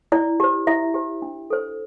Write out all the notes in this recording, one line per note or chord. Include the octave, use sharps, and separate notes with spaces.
E4 D5
G4 C5
E4 E5
G4 C5
D4
A4 C5